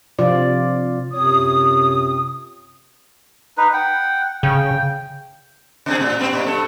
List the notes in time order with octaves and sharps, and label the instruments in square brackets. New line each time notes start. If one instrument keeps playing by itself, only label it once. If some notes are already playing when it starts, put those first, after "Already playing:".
[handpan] C3 F3 F4 D5
[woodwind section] F#2 C3 C4 F4 C#5 D#6
[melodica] D#4 B4
F#5 G5
[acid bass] C#3 [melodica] G5
[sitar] C#3 C4 G#4
A2
G2 B3 C4
G2 A#2
G2 A4